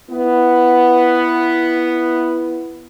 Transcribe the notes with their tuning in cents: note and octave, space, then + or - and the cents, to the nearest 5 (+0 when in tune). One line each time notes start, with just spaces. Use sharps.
B3 +0 E4 +10